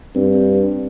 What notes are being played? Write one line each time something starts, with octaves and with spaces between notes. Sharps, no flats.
G2 C4